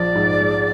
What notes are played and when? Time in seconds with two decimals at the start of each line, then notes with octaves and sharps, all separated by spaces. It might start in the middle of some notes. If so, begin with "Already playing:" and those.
Already playing: A#1 F3 D5
0.15 G#2
0.40 G#3